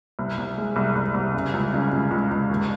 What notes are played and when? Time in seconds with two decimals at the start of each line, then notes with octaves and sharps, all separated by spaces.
0.19 C2
0.37 C2
0.57 G#3
0.76 C2
0.95 C2
1.14 C2
1.34 C#3
1.53 C#2
1.73 C#3
1.92 C#2
2.11 C#2
2.31 C#2
2.50 D#2